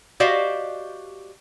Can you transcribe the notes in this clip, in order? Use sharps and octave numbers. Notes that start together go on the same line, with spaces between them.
F#4 G4 C5 D5 D#5 F5